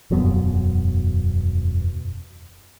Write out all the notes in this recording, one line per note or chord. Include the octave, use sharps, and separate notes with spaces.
E1 F#2 F#3 B3